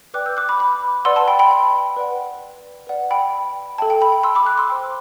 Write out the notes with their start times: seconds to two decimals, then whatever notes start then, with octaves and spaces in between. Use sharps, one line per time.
0.14 B4 D5 G5 D6 F#6
0.26 E6 G6
0.37 D6 F#6
0.49 B5 D6
0.59 B5 D6
1.05 B4 D5 F#5 C6 E6
1.16 A5 C6
1.28 G5 B5
1.39 G5 B5
1.51 G5
1.97 B4 D5 F#5
2.87 B4 D5 F#5
3.11 G5 B5
3.78 A4 E5 G5 A5
3.90 G5
4.01 G5 B5
4.12 G5
4.23 C6 E6
4.35 B5 D6
4.46 D6 F#6
4.58 C6 E6
4.69 C5 G5